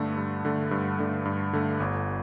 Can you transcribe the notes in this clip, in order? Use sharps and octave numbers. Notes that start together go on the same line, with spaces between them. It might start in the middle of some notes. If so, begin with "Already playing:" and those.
Already playing: G2 D3 A3
G2
D3 A3
G2
D3 A3
G2
D3 A3
G1